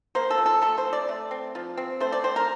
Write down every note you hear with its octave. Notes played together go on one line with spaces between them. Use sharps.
A#3 C5
A4
F3
A4
A3 A4
C5
C4
D5
A3
C4
F3
C4
A3 C5
D5
C4 C5
A#4